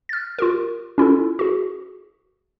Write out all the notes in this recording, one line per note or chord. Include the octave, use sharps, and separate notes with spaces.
F6 A6
F4 G4 A#4
C#4 E4 F4 A4
F#4 G#4